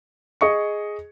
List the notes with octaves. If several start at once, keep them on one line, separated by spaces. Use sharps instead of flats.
G#4 D#5 C#6 C#7